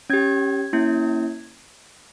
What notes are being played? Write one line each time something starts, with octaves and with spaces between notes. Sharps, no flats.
C#4 G4 G#6
A#3 C#4 E4